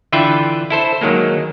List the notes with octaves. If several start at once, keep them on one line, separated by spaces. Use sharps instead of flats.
D3 E3 F4 B4 E5 G5
E4 A4 C5
D#3 F#3 G#3 A#3